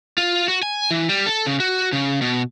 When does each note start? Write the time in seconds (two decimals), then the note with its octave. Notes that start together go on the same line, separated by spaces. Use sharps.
0.18 F4
0.48 F#4
0.63 G#5
0.91 E3
1.09 G3
1.26 A4
1.46 C#3
1.60 F#4
1.93 C#3
2.21 B2